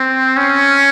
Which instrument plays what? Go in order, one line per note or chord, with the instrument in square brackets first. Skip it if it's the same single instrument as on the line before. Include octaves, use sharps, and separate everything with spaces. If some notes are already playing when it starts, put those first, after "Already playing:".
Already playing: [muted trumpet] C4
C#4